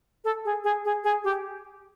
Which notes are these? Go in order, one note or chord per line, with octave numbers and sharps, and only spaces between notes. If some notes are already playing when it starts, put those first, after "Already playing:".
A4
G#4
G#4
G#4
G#4
G4